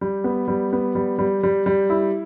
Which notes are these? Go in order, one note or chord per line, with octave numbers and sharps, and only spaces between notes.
G3
B3
G3
B3
G3
G3
G3
G3
E4